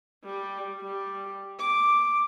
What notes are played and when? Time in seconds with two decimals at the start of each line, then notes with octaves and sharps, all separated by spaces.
0.24 G3
0.82 G3
1.60 D6